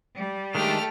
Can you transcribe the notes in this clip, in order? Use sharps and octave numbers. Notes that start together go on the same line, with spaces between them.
G3
D#3 G#3 A3 D4 G4 A4 F6